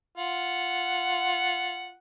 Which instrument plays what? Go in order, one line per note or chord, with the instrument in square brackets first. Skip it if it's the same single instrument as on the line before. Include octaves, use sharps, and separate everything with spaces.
[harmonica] F4 F#5